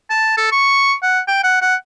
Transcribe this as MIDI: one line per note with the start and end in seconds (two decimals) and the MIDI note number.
0.10 0.35 81
0.37 0.48 69
0.52 0.94 85
1.03 1.20 78
1.28 1.41 79
1.44 1.61 78
1.62 1.75 78